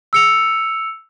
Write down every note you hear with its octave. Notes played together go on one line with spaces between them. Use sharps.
E6 C#7 F7